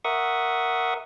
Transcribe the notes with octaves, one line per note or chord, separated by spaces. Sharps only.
A#4 E5 F#5 C#6 D#6